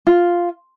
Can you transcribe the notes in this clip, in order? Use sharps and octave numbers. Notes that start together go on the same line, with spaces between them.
F4